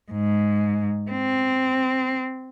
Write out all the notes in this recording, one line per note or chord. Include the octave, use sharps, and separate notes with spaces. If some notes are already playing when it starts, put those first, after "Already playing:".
G#2
C4